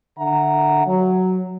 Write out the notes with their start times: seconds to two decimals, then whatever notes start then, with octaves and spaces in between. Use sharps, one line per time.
0.19 D3 E5 F#5 A#5
0.87 F#3